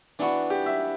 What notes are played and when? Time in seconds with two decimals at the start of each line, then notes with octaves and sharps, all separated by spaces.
0.19 E3 B3 D4 F#4
0.50 G4
0.66 E5